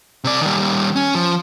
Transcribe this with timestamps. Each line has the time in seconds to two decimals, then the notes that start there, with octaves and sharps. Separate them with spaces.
0.24 C3 D5
0.41 D#3 G3
0.96 C#4
1.15 F3